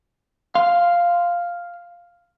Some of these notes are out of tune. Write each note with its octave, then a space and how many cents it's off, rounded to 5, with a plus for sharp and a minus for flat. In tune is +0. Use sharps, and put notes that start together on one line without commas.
F5 +0 C6 -5